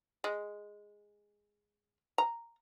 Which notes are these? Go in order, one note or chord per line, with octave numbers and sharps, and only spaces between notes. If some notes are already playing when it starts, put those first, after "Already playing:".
G#3
A#5